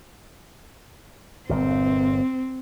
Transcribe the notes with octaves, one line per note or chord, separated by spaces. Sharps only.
G1 A#2 C4